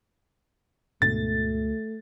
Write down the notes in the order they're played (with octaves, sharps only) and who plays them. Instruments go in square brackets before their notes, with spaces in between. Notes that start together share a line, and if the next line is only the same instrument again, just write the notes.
[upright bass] D2 [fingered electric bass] G#2 B2 D3 [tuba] A3 [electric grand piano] A6